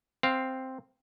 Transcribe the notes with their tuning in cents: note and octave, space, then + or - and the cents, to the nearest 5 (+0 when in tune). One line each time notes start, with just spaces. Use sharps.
C4 +0 F5 +0